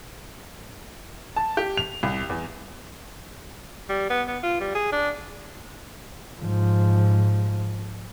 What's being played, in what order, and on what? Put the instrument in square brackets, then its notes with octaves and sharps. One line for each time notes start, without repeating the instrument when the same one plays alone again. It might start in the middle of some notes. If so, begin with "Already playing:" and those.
[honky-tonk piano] A5
G4
F7
C2
E2
[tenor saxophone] G3
B3
B3
F4
G3
G#4
D4
[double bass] G#2 F3